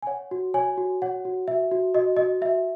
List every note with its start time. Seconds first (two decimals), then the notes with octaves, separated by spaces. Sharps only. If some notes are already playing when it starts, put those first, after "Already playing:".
0.02 G#5
0.07 C#5 F#5
0.31 F#4
0.54 C#5 G#5
0.78 F#4
1.02 C#5 F#5
1.25 F#4
1.48 F#4 E5
1.71 F#4
1.95 F#4 D#5
2.17 F#4 D#5
2.41 F#4 E5